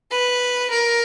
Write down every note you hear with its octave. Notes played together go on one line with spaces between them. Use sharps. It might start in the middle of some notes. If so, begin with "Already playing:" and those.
B4
A#4